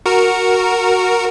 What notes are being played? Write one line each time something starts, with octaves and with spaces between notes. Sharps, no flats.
F#4 A#4